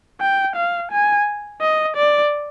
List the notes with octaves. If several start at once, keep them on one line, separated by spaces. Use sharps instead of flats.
G5
F5
G#5
D#5
D5